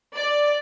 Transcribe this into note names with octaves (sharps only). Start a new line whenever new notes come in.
D5